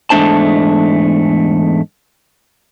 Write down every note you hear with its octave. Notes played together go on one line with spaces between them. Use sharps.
E2 G#2 A3 D4 C5 A5